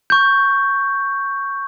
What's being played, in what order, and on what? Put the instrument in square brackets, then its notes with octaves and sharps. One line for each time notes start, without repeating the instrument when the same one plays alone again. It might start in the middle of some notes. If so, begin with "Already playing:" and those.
[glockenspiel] C#6 G6